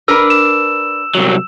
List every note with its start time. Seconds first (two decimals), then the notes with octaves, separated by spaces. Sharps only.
0.08 D4 A#4 B4 E6
0.30 E7
1.15 C2 F#3